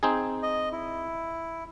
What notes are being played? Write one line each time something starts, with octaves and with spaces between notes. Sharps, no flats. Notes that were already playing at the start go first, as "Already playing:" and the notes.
C4 D#4 G#4
D#5
E4